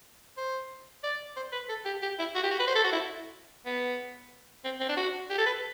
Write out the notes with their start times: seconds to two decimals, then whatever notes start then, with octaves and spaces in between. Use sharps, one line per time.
0.38 C5
1.04 D5
1.37 C5
1.53 B4
1.69 A4
1.85 G4
2.03 G4
2.19 E4
2.35 F#4
2.43 G4
2.51 F#4
2.59 B4
2.67 C5
2.75 A4
2.84 F#4
2.93 E4
3.66 B3
4.65 C4
4.80 C4
4.89 D4
4.97 F#4
5.30 G4
5.38 A4
5.46 B4